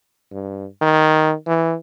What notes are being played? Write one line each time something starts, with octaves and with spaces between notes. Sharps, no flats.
G2
D#3
E3